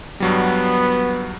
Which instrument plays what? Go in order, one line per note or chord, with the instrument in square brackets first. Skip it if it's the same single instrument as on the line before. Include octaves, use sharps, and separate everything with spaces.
[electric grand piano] G2 F#3 G3 [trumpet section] B3